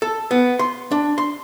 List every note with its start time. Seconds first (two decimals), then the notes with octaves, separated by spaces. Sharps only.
0.02 A4
0.31 B3
0.59 C6
0.91 D4
1.18 C6